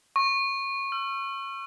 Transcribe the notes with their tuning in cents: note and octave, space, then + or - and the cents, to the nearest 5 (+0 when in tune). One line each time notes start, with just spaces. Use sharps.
C#6 -20
E6 +45